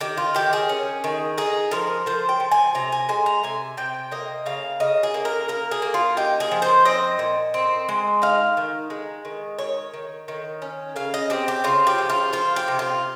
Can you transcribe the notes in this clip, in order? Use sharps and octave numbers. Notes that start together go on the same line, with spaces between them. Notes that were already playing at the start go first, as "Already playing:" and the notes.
D#3 G4
F4
D#3 G4
G#4
C#4
D#3
D#4 G#4
F3 A#4
F3 C5
G5
F3
G#5
C3 A#5
G#5
G#3 G#5
A#5
C3 G#5
C3 G5
A#3 D#5
C#3 F5
C#3 D#5
G#4
A#3
A#4
A#3 A#4
G#4
A#3
F4
D#4 G4
G#4
F3
C5
C4 D#5
A#2
C4
G#3
D#4 F5
D#3
G#3
D#3
D#3 C#5
D#3
D#3
C#4
C#3 F5
D#5
C4 G4
G4
C#3 F4
G4
F3
F4
F3 F4
G4
C3
F4